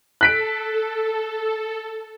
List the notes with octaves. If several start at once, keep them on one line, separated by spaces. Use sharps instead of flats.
A4 F#6 B6 D7